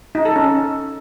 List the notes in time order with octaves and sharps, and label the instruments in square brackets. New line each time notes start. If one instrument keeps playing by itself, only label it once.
[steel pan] D#4
A4
C#4